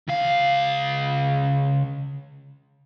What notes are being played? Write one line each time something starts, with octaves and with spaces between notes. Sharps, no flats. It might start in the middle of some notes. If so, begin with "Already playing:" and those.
C#2 F5